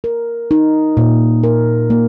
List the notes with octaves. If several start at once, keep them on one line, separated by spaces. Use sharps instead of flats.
A#4
D#4
A#2
A#4
A#3